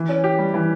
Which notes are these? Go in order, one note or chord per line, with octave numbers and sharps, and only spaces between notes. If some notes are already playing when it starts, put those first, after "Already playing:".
Already playing: E3
C#4
G4
G3
E3